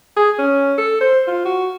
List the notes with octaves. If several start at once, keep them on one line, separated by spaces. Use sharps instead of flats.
G#4
C#4
A4
C5
F4
F#4